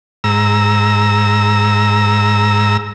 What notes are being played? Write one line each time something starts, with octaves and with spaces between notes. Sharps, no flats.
G#2 A#5 E6